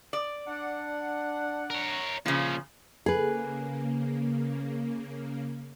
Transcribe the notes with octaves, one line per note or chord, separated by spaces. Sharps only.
D5
D4 F#5
A#4 C#5
A#2 C#3 F3 C#4
C#3 A#3 G#4 B4